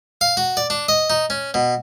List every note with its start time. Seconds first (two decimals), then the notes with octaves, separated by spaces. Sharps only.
0.21 F5
0.37 F#4
0.57 D5
0.70 D4
0.88 D#5
1.10 D#4
1.30 C#4
1.54 B2